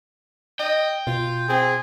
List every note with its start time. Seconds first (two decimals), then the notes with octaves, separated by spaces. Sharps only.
0.59 D#5 G5
1.07 B2 F4
1.49 C4 G#4